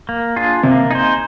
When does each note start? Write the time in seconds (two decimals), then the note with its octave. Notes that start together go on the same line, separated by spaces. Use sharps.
0.09 A#3
0.36 D4 F4 G#4
0.63 C3 A#3
0.91 D#4 G#4 C5